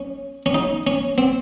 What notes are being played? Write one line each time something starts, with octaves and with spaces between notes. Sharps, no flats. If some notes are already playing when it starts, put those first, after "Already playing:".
Already playing: C#4
C#4
D#4
C#4
C4